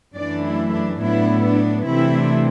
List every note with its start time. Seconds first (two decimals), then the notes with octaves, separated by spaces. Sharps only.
0.15 F#2 E3 A3 D4 D5
0.43 E4
0.73 D4
1.01 A2 F#3 B3 D4 E4
1.44 D4
1.87 C3 E3 A3 D4 E4